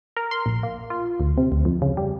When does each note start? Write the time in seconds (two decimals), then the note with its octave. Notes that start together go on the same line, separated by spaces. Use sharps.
0.17 A#4
0.31 C6
0.46 A#1
0.63 A#3
0.90 F4
1.20 D2
1.38 C3
1.52 D2
1.65 F2
1.82 C#3
1.97 G3